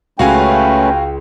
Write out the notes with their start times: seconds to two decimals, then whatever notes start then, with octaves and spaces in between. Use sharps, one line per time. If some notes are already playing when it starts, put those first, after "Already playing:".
0.19 C#2 A3 C#4 F#4 B4 F5 G5 G#5